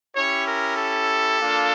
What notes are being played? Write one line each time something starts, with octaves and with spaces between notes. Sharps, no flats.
C#4 E4 G4 C#5
A#4
A4
A#3 D4 F4